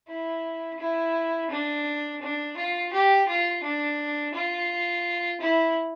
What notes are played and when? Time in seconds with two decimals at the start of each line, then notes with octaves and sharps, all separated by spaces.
0.08 E4
0.79 E4
1.50 D4
2.21 D4
2.57 F4
2.93 G4
3.28 F4
3.63 D4
4.34 F4
5.41 E4